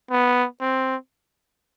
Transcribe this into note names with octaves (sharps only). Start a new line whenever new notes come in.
B3
C4